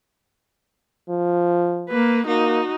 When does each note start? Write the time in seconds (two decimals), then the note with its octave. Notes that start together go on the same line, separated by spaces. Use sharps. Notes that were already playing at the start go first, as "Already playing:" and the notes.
1.09 F3
1.89 A#3 B4
2.27 A#3 D#4 F#4